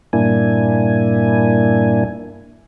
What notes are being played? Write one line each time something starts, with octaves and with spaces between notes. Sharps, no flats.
G2 A#2 A#3 D4 E4 G#5